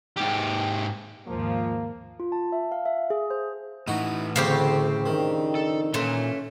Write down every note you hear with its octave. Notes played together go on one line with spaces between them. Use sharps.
G#2 G4
D#2 G#2 F3 A#3
F4
A5
E5
F5
E5
G#4
C5
A2 E3 D#4 F#4
D2 C#3 A3 C4 G4
F2 D#3 D4 D#4
A4
A#2 E3 A3 C#4 C6